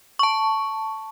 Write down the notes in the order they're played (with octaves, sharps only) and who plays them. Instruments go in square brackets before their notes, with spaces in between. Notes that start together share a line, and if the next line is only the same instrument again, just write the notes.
[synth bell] A5 C#6